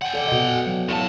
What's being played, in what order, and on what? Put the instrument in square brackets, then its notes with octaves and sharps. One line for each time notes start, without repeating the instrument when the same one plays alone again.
[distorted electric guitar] F#5 G5
[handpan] A4 D5
B2 D#5
F#3
[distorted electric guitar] A2 A5 [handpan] E4 F5